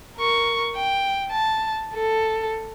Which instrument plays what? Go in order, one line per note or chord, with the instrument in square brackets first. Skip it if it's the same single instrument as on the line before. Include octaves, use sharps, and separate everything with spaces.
[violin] A#4 C#6
G5
A5
A4